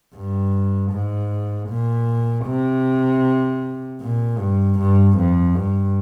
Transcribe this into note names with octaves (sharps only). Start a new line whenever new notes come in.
G2
G#2
A#2
C3
A#2
G2
G2
F2
G2